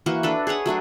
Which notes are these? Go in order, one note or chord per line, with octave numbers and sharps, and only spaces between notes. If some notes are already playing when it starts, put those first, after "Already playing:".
E3 A#3 F#4 C#6
D4 A4 B4
G#4 B4 C#5 F#5
F#3 A3 D4 G#4